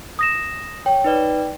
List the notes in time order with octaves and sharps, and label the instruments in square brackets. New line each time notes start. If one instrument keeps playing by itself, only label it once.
[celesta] D#6 A#6 E7
[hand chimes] C#5 [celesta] G5
[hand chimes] D#4 B4 D5